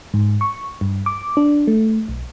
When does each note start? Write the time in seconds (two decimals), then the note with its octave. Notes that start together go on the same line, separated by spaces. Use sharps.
0.14 G#2
0.41 C#6
0.81 G2
1.06 D6
1.37 D4
1.67 A3
2.08 B1